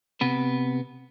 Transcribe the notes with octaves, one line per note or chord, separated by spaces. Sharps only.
C3 B3 B4